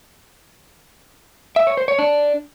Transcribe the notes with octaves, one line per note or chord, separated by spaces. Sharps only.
E5
C#5
C5
C#5
D4